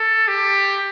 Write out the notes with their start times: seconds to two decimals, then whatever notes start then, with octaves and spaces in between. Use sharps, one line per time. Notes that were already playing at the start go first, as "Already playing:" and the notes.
Already playing: A4
0.28 G4